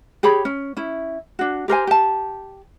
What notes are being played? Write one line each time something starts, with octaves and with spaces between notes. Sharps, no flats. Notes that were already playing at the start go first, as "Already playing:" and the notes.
G4 G#4 C#5 B5
C#4
C#4 E4
D4 F#4
G4 A#4 C5 G#5
G4 A5